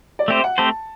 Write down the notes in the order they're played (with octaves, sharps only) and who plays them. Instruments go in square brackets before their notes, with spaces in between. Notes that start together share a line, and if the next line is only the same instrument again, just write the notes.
[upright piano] D5
[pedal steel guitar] A3 C4 G4 C5 [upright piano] E5
[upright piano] F#5
[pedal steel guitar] A3 C4 G4 C5 [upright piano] A5